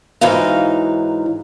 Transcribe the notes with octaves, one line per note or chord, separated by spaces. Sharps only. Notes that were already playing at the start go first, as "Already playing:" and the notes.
G#2 E3 F#3 D#4 F5